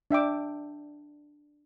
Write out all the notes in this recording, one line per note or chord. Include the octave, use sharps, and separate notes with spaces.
D4 E5 G5 D6